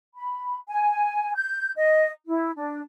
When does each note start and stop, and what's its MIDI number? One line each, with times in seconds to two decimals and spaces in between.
0.14 0.56 83
0.68 1.33 80
1.35 1.71 91
1.76 2.10 75
2.26 2.51 64
2.56 2.80 62